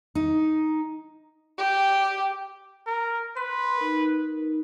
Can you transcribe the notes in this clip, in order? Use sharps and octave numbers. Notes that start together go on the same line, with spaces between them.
D#4
G4 G5
A#4
B4 C6
D#4 A#4